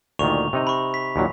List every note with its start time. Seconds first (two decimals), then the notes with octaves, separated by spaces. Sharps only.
0.19 D2 A#2 D#3 C#6 F7
0.53 C3 D#4 D#5
0.67 B5 C#6
0.94 B6
1.16 D#2 A#2 F#3